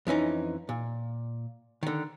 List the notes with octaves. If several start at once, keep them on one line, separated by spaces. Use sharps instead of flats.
F2 E3 C#4 D#4
A#2
D3 D#3